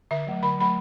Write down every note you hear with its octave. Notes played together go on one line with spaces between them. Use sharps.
D3 E5
F#3 A3
D3 B5
F#3 A3 B5